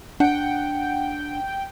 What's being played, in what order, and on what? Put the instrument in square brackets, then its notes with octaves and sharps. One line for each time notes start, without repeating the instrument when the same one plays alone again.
[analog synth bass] D4 [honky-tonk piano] F#5 [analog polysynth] G5